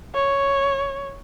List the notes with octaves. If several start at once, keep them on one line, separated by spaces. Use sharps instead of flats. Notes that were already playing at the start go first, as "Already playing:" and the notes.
C#5